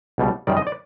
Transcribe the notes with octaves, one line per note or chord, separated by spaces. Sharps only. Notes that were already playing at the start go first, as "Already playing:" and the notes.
C#2 B2 G3
F#2 D#3 G3 D5
D#5
D5